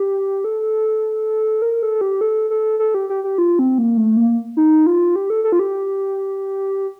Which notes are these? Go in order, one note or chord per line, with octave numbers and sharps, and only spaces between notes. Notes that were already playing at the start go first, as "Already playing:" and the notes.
Already playing: G4
A4
A#4
A4
G4
A4
A4
A4
G4
G4
G4
F4
C4
A#3
A3
A#3
D#4
F4
G4
A4
A4
F4
G4